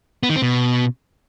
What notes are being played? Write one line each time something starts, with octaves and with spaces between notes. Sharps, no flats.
B3
D#3
C4
B2